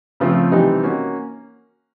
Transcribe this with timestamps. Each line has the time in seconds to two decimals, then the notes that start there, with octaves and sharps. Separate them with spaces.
0.20 C#3 F3 A3 C4 F4
0.52 C3 E3 G3 C4 D#4
0.83 A#3 C#4 F#4